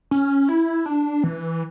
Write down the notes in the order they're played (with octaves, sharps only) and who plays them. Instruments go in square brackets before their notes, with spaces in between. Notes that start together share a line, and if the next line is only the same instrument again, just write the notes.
[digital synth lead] C#4
E4
D4
E3